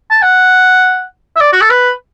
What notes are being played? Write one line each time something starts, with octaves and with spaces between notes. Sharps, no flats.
A5
F#5
E5
D5
F#4
A4
B4